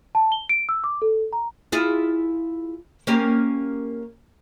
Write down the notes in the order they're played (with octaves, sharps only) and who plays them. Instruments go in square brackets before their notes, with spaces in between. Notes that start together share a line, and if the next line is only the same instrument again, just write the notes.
[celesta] A5
G7
D7
E6
D6
A4
A#5
[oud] E4 F4 G#4
A#3 C#4 G4